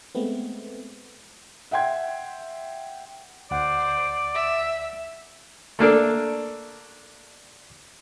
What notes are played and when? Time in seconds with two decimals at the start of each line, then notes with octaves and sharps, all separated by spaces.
0.15 G#3 A3 B3 C4
1.71 E5 F#5 G5 C6 G#6
3.51 D2 C5 D5 F#5
4.34 E5
5.79 A3 A#3 D4 A4